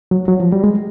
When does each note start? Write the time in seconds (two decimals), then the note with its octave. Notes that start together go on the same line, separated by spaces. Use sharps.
0.11 F#3
0.28 F#3
0.40 F3
0.52 G3
0.64 G#3